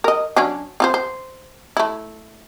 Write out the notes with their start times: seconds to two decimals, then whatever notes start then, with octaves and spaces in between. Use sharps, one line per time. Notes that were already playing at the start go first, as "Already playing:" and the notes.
0.04 A#4 D#5
0.36 F#3 C#4 D4
0.80 C4 F4 C5
0.94 C5
1.77 A3 E4